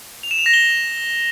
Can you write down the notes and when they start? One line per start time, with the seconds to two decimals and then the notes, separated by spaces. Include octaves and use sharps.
0.23 F7
0.31 E7
0.38 F7
0.46 A#6
0.54 G7